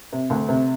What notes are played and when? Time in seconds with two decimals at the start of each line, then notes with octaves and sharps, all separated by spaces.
0.13 C3
0.30 D2
0.49 C3